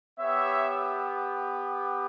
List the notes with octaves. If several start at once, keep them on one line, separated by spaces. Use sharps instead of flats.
B3 G4 C#5 E5